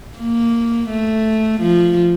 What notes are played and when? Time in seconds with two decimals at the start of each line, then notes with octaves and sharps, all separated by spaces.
0.18 A#3
0.90 A3
1.61 F3